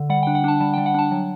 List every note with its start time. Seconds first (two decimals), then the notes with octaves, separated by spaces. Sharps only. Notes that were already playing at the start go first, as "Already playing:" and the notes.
Already playing: D3
0.10 G3 F#5
0.23 D4 G5
0.35 F#5
0.44 D4 A5
0.60 G3 A5
0.74 G3 G5
0.86 F#5
0.94 D4 A5
1.12 F#3